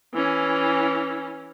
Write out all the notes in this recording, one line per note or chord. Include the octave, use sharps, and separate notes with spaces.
E3 C#4